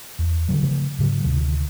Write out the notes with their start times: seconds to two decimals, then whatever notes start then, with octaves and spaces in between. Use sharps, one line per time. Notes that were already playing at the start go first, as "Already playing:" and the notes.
0.19 E2
0.49 D3 D#3 F#3
0.63 C#3 F3 A3
0.99 G#2 C#3 F#3
1.24 D2 C3 D#3